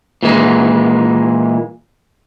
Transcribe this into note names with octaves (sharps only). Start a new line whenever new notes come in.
A#2 E3 G#3